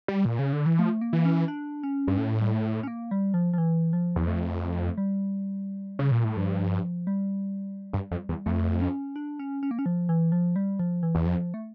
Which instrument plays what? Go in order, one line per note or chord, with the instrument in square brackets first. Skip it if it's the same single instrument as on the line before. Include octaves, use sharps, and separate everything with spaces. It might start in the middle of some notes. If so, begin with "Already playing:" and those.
[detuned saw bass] G3
A#2
C#3
D3
E3
[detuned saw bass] F3 [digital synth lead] A3
[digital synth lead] A#3
[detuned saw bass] E3
[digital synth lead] A#3
C#4
D4
C#4
[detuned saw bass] G2
A2
[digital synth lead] G3
A3
C#4
A#3
G3
F3
F3
E3
F3
[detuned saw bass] E2
[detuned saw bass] F2 [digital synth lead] A3
[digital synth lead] G3
[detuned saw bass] C#3
A#2
A2
[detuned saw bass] G2 [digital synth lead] F3
[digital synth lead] G3
[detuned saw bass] G2
F2
E2
[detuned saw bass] F2 [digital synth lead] A3
[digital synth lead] C#4
D4
C#4
C#4
A#3
C#4
F3
E3
F3
G3
F3
E3
[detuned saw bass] E2
[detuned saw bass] F2 [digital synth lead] F3
[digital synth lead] A3